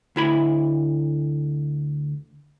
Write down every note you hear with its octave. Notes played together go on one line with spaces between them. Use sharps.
D2 E4 B5